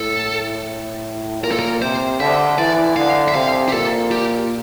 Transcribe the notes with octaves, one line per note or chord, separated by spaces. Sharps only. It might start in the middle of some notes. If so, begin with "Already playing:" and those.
Already playing: A2 A4
A#2 A#4
A4
A#4
C3 C5
D3 E5
E3 D5
D3 F5
E5
C3 F5
G4
A#2 A4
G4